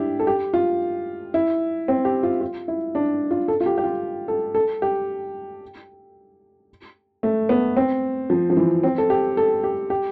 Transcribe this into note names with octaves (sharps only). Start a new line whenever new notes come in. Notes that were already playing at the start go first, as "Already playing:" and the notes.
Already playing: D4 E4 G4
A4
G4
F4
E4
C4
G4
F4
F4
E4
D4
F4
A4
F4
G4
G4
F4
A4
A4
G4
A3
B3
C4
F3
F3
E3
C4
A4
G4
A4
G4
G4